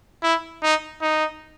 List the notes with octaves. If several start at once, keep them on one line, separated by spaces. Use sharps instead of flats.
E4
D#4
D#4